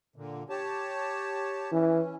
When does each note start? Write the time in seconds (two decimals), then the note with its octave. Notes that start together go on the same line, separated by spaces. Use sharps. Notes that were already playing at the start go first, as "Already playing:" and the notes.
0.16 A#2 D3
0.50 G4 C#5 A5
1.72 E3 C#4